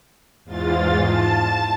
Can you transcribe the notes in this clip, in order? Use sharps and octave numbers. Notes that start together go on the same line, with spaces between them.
E2 G#2 F4 A6
A5 A6